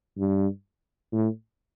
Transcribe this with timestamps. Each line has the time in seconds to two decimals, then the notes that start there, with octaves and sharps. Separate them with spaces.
0.18 G2
1.13 A2